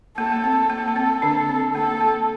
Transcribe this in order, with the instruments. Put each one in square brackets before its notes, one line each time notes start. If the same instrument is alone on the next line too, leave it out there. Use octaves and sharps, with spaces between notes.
[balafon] A#3 [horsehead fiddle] A4
[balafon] A#3
C4
[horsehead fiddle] A4
[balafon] A#3
A#3
C4
D3 D4
C4
[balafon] A#3 [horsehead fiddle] A4
[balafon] A#3